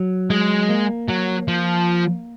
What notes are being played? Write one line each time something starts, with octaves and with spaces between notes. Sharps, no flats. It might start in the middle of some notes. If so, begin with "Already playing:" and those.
Already playing: F#3
G#3
A#3
F#3
F3